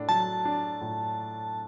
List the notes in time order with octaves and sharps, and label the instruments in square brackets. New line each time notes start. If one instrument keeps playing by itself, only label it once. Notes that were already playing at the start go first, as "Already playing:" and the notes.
Already playing: [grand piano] A2 D4
[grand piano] F#3 [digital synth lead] A5
[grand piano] D4
A2